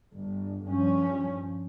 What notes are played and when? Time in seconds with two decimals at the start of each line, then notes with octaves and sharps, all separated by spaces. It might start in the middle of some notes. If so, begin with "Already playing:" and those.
0.13 G1
0.64 G2 F3 C#4